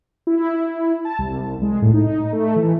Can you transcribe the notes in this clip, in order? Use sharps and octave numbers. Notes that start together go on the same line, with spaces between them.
E4
A5
C2
G#3
A2
D#4
A3
E3